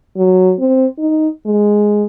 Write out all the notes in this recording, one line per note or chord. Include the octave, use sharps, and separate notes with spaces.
F#3
C4
D#4
G#3